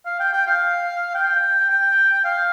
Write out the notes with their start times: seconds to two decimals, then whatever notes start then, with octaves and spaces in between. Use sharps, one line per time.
0.06 F5
0.20 G5
0.33 G5
0.47 F5
1.15 G5
1.70 G5
2.25 F5